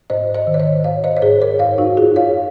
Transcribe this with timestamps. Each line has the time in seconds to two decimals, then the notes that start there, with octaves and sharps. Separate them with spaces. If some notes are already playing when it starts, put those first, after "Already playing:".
0.10 G#2 C5 D#5
0.35 C5 D#5
0.47 D#3
0.54 C#5
0.60 C5 D#5
0.84 G#2 C#5 F5
1.04 C5 D#5
1.17 C#5
1.22 G#2 G#4 C5
1.41 A#4 C#5
1.59 F#2 C#5 F5
1.78 D#4 F#4
1.97 F#2 F4 G#4
2.16 C#5 F5